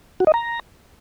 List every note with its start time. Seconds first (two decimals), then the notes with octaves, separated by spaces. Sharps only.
0.20 F#4
0.27 D#5
0.34 A#5